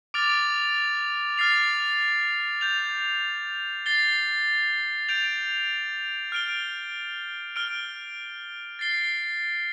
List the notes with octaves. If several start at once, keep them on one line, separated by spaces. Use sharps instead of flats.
D6 F6 A6 D7 F7
F6 A6 C7 F7
G6 F7
A6 C7 G7
G6 D7 F7
F6 D7 G7
F6 D7 G7
A6 C7 G7